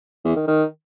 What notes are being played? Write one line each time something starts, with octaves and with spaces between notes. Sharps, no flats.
E2
D#3
D#3